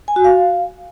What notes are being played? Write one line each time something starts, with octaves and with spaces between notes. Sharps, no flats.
G#5
F#4
F5